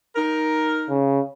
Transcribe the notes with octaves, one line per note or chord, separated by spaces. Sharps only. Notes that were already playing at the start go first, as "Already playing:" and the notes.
D#4 A#4
C#3